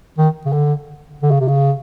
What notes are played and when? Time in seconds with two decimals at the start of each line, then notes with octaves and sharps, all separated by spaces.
0.18 D#3
0.45 C#3
0.52 D3
1.22 D3
1.30 C#3
1.40 C3
1.48 C#3